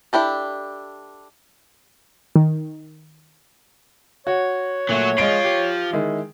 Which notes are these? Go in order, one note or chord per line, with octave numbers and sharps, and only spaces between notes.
D4 E4 G4 A4
D#3
F#4 C#5
A#2 F#3 A3 F#4
F3 G#3 F4 D7
G4
D#3 G#3 E4